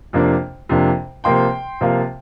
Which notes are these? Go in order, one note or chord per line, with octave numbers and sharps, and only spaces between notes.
F2 C3 A#3 D4
F2 C3 A#3 D4
C3 F3 A#3 F4 G5 C6
C3 F3 A#3 F4